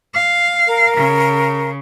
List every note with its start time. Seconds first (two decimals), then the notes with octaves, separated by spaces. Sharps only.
0.14 F5
0.67 A#4
0.97 C#3